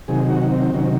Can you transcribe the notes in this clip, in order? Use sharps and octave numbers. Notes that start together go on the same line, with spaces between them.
C3 D#3 F#3 G#4
F#4
C4
C3 D#3 F#3 C#4